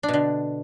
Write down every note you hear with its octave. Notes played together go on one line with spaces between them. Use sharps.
D4
B2
D3